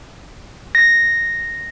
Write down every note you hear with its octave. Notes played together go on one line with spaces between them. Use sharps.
A#6